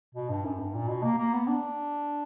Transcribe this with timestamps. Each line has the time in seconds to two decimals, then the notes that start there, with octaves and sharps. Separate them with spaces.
0.15 B2
0.29 G2
0.45 F#2
0.59 G2
0.75 A#2
0.88 B2
1.03 A#3
1.18 A#3
1.34 B3
1.48 D4